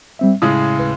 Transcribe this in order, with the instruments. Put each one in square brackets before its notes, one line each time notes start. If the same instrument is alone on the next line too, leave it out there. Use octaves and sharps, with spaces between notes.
[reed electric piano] G3 C4 E5
[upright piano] A2 C#3 G#3 [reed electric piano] D#6
[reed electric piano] D#2 B4